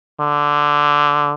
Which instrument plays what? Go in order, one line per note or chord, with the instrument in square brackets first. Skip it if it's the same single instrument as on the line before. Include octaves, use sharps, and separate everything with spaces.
[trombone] D3